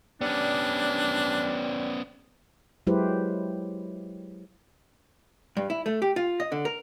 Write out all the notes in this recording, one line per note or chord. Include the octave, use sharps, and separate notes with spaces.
G3 B3 C#4 D4
F#3 G#3 E4 G4 B4 C5
G2
E4
A3
G4
F4
D#5
D3
A#4